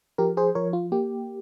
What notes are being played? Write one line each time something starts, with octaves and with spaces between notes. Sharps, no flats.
F3 G4 A#4
G#4 C5
F3 A#4 C#5
F4
A#3 G4